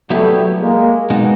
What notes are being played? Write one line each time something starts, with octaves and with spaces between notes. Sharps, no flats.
F#3 G3 A3 B3 E4 G4
G#3 A#3
B2 G#3 B3 D#4 F#4